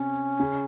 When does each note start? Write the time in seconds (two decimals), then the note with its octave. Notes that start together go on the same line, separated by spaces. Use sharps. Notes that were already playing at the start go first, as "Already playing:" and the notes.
Already playing: C3 C#4
0.40 C#3